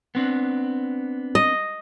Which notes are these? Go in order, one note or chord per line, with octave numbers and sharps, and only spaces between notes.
B3 C4 D4
D#5